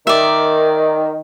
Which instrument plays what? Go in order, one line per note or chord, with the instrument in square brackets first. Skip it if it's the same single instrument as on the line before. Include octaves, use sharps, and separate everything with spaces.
[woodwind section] D#3 [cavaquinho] D5 E5